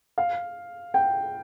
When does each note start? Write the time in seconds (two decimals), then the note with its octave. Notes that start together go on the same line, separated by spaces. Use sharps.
0.18 F5
0.94 G5